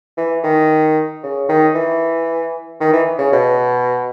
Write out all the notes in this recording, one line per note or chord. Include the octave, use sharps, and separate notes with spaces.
E3
D#3
C#3
D#3
E3
D#3
E3
C#3
B2